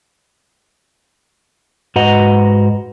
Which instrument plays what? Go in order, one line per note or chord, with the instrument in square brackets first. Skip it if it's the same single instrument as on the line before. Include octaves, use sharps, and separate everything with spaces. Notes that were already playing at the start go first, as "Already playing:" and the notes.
[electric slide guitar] G#2 F#4 B4 D#5 F#5 A#5